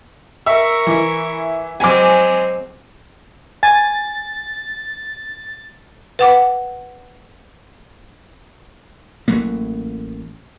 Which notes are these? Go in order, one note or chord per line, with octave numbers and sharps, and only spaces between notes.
A#4 E5 C#6
E3 E4
F#3 G#3 C4 G#5 D6
G#5 A6
B4 F#5 D6
A1 F#3 A3 A#3